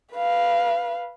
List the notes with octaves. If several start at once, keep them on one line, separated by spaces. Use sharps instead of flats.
B4 F5